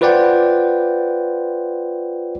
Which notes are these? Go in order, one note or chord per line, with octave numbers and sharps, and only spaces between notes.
F4 B4 C5 D5 F#5 G5